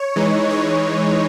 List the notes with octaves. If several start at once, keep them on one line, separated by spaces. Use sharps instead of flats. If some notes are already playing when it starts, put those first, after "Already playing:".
Already playing: C#5
E3 G#3 D#4
C#5